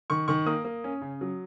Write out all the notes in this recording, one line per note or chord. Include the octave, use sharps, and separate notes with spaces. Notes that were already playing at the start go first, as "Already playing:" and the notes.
D#3 C#6
D#3 C#6
A#3 D#6
A#3
C#4
C#3
F#3